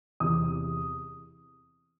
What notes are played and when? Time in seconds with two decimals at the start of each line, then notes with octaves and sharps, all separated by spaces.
0.20 E2 C3 E3 D#6